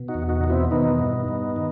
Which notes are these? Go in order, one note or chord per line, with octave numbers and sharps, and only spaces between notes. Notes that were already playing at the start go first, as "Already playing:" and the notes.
Already playing: B2
D#4 F#4
E2
D#4 F#4
B2 D#4
C4 E4
D#3 B3 D#4
G2
G2
D#3